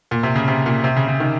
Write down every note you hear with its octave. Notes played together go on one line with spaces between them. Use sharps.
A#2
C3
C#3
C3
A#2
C3
C#3
C#3
D#3